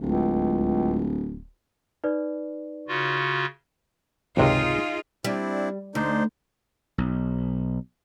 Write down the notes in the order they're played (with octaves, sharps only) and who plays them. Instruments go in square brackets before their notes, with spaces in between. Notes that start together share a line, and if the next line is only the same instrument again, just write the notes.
[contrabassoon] D1 [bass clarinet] C#2
[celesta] D#4 B4 D5
[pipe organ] C#3 F4 F#4
[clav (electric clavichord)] G#1 C#2 C3 [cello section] D#4 F4 G#4
[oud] G3 [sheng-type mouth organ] C4 D4 E4
[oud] D2 [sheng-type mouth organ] D4 D#4 C5
[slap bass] B1